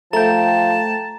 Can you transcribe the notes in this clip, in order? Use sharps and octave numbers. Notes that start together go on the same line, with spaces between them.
F3 A3 G5 A5 A#5